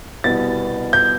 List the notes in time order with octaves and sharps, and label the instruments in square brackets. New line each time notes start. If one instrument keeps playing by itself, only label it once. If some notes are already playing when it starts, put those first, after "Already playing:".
[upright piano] C2 B2 B3 A6
G6